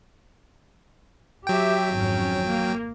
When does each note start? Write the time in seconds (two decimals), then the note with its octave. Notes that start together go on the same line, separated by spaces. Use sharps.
1.47 F#3 G4 E5 G5
1.94 G#1 F2 C#4
2.46 A#3